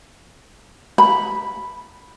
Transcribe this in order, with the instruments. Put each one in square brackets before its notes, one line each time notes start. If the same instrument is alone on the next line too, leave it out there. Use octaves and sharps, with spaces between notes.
[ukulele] B5